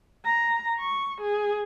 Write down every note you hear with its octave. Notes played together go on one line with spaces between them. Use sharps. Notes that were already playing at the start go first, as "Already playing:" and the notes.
A#5
C#6
G#4